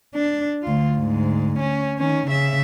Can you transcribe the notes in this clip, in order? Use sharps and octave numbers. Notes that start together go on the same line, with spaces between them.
D4
D2 F4
D2 G#2
C#4
D#3 C#4
C#3 E5